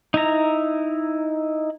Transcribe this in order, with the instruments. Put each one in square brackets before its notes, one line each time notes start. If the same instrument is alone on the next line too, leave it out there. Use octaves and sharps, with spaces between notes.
[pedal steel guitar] D#4 E4 A#5